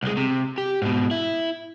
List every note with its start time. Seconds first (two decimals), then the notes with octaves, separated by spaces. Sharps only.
0.03 C2 G#3
0.17 C3
0.58 G4
0.82 G#2 B2
1.11 E4